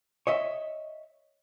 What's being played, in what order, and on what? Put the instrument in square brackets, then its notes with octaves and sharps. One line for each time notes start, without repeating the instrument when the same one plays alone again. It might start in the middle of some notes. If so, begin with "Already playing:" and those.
[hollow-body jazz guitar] C#5 D#5 E5